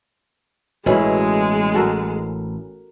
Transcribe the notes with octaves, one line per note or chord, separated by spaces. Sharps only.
A1 B2 G#3 C#4 E4
F#4 A4 A#4